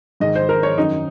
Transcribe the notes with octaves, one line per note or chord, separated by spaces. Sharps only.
G#2 D#3 D#5
C5
A#4
C#5
F#2 D#3 D#4